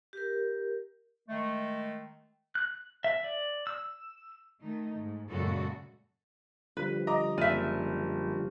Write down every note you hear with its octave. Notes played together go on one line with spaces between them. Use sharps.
G4 A#4
D#3 G#3 A3
F#6
E5
D5
E6
D#3 A3 D#4
G#2
F#2 A#2 C#3 G#3 F#4 A4
D3 F3 G3 B4
D#5 A#5 D6
F#1 D5 E5 F6 D#7